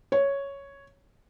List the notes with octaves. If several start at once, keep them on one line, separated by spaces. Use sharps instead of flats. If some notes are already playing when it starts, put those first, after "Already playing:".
C#5